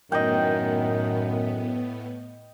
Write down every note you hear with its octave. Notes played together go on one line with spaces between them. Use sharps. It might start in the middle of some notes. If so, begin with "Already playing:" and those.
F#2 A2 D#3 B3 D#5 G5